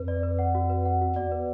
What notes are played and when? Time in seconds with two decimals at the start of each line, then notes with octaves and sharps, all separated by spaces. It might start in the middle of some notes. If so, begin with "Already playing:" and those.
Already playing: F2 B4
0.08 D5
0.23 B4
0.39 F#5
0.55 F#4
0.70 B4
0.85 F#5
1.01 F#4
1.16 E2 D5
1.32 B4